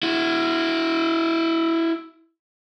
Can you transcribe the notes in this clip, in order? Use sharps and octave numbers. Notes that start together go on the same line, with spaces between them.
E4 F#4